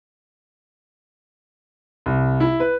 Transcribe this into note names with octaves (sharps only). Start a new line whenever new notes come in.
C2
E4
B4